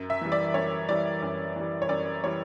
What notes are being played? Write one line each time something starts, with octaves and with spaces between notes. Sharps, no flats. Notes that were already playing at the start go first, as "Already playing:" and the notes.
Already playing: F#2
E5
E3 G3
D5
F#2 C#5
E3 G3 D5
F#2
E3 G3
C#5
F#2 D5
E3 G3 C#5